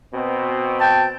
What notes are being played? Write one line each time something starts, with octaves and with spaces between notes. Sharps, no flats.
B2 C4
G5 A5